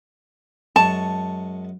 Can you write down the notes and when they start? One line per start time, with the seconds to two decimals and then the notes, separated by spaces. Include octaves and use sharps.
0.76 F#2 G#3 A5 C#6